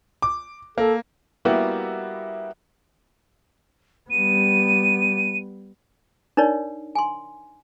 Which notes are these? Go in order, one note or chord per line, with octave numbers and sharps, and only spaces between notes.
D6
A#3 A4
G3 A#3 B3 E4 F#4 G4
G3 B3 D#7
D4 D#4 A#4 C#5 D5
G#5 C6